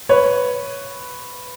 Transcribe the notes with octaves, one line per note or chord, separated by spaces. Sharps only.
B4 C#5